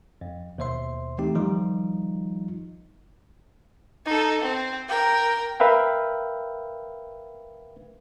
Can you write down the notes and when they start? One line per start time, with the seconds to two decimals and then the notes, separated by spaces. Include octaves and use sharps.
0.21 F2
0.58 D#2 B2 C5 E5 C6
1.18 E3 A3 C4 D#4 G4
1.35 D#3 F3 G3 D#4 F4
4.06 D#4 A4
4.41 C4
4.89 A#4 G5
5.60 A#4 B4 E5 F5 G5